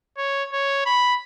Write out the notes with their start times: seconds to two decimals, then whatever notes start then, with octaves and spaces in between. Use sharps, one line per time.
0.18 C#5
0.53 C#5
0.86 B5